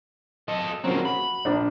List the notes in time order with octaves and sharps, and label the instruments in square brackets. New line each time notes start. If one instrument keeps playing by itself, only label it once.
[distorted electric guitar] A4 D#5
[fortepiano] C#3 F3 F#3 [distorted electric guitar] A#3 C4
[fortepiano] F#4 [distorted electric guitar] B5
[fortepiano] A#1 D4